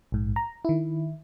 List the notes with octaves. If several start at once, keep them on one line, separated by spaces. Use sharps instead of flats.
A#1 G#2
A#5
D#3 E4